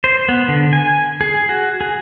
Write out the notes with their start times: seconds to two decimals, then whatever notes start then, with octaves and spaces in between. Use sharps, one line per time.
0.04 C5
0.29 B3
0.48 D3
0.73 G#5
1.21 G#4
1.49 F#4
1.81 G#4